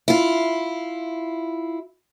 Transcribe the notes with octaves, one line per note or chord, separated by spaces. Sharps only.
E4 F4